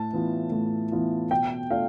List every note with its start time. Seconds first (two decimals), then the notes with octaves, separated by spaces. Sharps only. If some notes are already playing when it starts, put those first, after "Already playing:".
Already playing: A2 A5
0.13 E3 B3 F4
0.52 A2
0.92 E3 B3 F4
1.31 B2 G5
1.71 A3 D4 F4 F5